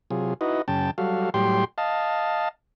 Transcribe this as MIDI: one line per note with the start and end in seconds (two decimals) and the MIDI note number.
0.11 0.34 48
0.11 0.34 54
0.11 0.34 65
0.11 0.34 68
0.41 0.62 63
0.41 0.62 64
0.41 0.62 66
0.41 0.62 71
0.41 0.62 75
0.68 0.91 42
0.68 0.91 49
0.68 0.91 79
0.68 0.91 81
0.98 1.30 54
0.98 1.30 55
0.98 1.30 66
0.98 1.30 69
0.98 1.30 77
1.34 1.64 45
1.34 1.64 54
1.34 1.64 55
1.34 1.64 67
1.34 1.64 79
1.34 1.64 84
1.78 2.49 75
1.78 2.49 77
1.78 2.49 81